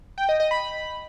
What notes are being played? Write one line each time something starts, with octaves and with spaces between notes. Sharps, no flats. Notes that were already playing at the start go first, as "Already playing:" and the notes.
G5
D#5
D#5
B5